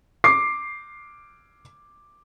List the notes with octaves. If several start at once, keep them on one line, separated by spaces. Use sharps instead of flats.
D6 C7